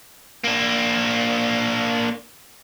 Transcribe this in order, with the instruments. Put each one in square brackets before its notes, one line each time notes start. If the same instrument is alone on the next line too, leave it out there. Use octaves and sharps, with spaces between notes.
[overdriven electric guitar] A#3 D4